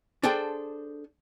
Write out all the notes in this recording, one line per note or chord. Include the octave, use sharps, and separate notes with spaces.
D4 G#4 A4 C5 G5 A5